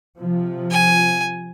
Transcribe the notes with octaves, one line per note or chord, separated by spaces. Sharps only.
C3 F3
G#5